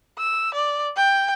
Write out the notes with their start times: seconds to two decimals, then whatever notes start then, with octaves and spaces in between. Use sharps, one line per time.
0.18 E6
0.54 D5
0.97 G5